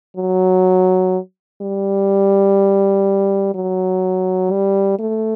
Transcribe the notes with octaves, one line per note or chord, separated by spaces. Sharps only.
F#3
G3
F#3
G3
A3